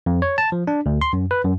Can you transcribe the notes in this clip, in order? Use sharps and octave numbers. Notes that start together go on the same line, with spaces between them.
F2
C#5
A5
F3
D4
D2
C6
F#2
B4
F#2